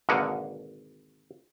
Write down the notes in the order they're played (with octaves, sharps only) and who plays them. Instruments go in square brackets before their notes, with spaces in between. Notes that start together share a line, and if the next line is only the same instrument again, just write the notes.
[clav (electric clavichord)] G#1 B2 D3 A#3 D#5 F#5